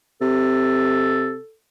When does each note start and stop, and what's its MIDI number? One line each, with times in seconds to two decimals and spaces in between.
0.21 1.36 48
0.21 1.54 69